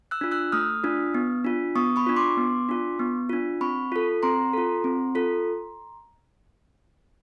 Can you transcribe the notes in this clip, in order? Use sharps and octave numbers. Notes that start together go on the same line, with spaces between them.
E6 F#6
D4 F4
E6 F#6
A3 D#6 F6
D4 F4
B3
D4 F4
B3 C#6 D#6
B5 C#6
D4 F4
C6 D6
B3
D4 F4
B3
D4 F4
C4 B5 C#6
F4 A4
C4 A#5 C6
F4 A4
C4
F4 A4